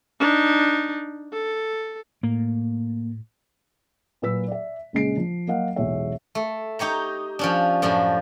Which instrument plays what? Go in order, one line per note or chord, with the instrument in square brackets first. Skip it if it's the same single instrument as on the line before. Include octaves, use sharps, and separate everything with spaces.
[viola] D4 D#4
A4
[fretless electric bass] A2 [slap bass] A#3
[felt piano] A#2 F#3 B4 E6 B6
D5 E5
A#1 C#3 G#3 C7 D7
F3
F#3 A#3 D#5 F5 F#5
B1 E2 G#3 B3 C#5 E5
[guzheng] A3
D#4 G4 C#5 A#5
F3 C#4 D4
F#2 A2 F3 D4